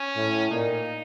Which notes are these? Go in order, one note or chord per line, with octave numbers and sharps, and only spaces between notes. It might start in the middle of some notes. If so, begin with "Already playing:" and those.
Already playing: C#4
A2
A#2 D#4